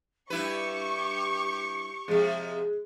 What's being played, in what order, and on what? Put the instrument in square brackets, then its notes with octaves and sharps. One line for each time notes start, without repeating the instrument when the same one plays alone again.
[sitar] G2 E4 B4 [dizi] G4 [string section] C#6
[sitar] C3 F3 [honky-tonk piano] G#3